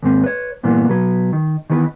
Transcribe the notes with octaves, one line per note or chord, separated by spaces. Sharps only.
D#2 G#2 C4
B4 C#5
G2 A#2 E3 A#3 B3
B2 F#3 B4
D#3
D#3 E3 B3 A4 B4